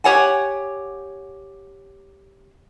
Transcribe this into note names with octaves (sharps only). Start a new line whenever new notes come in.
G4 C#5 F#5 G#5